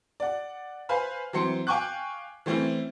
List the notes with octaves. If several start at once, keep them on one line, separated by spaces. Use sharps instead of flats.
D5 F#5
B4 C5 F5 G#5 B5
E3 F#3 C4 C6 C#7
F5 G5 G#5 C#6 D6 F#6
E3 A3 C4 C#4 E4